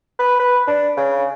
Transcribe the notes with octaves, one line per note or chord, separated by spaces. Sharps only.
B4
B4
D4
C#3